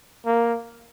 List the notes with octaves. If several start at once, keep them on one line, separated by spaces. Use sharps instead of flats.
A#3